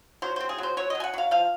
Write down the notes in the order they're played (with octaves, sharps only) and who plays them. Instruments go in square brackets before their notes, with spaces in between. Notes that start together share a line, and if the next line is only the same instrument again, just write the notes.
[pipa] F#3 C5
C4 C5
G#4
F#3 C5
F#3 C#5
D#5
F#3
G#5
F#5
F#3 F5
F3 F5